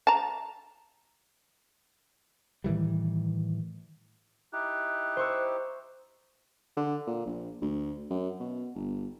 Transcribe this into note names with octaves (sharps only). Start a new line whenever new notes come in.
A5 A#5
A2 D#3 E3 G3
D#4 E4 G4 F#6
C5 C#6 E6
D3
A#2
A#1
D2
F#2
B2
G1